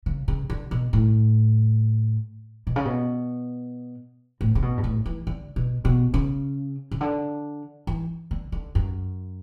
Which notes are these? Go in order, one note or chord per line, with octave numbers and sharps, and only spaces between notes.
C#3
C#3
D3
B2
A2
B2
C#3
B2
A2
C#3
B2
G2
A2
E3
D3
B2
B2
C#3
C#3
D3
E3
D3
D3
F#2